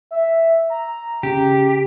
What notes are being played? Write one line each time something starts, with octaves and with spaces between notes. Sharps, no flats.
E5
A#5
C#3 G4